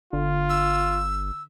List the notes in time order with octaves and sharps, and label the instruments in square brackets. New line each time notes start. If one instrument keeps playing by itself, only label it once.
[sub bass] G1 [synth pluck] D3 [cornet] F4
[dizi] E6